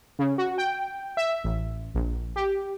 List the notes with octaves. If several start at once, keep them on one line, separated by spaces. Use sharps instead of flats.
C#3
F#4
G5
E5
A1
A#1
G4